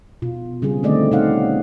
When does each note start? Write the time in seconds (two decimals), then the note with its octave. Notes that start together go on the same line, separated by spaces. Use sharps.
0.22 B2 F4
0.62 C#3 G3 B3 C4 G#4
0.83 D3 D#3 A3 C4 D5 D#5
1.11 B2 C#4 D#4 C5 F5 F#5